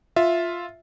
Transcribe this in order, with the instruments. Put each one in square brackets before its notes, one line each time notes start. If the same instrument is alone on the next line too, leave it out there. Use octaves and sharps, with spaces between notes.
[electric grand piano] F4 E5